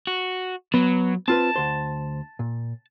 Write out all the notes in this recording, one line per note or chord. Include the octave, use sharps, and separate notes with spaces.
F#4
F#3 B3
C4 F4 B4 A5
D2 C5
A#2